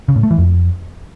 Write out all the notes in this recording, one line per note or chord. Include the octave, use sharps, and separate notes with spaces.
C#3
A2
A3
E3
F2